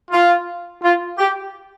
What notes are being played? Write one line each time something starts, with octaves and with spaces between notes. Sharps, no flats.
F4
F4
G4